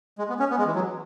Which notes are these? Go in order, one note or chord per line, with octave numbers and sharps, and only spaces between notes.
G#3
B3
C#4
B3
G#3
E3
F#3